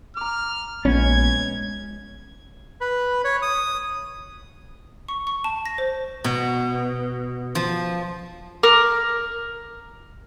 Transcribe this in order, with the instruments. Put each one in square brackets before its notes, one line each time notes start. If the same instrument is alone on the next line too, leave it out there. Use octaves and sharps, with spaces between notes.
[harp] A#5 D6 [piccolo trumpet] F6
[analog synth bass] A#1 [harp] G#3 B3 [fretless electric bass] C#4 [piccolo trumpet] G#6
[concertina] B4
C#5
D#6
[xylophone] C#6
C#6
A5
A#6
C5
[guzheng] B2
F3
[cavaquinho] A#4 D6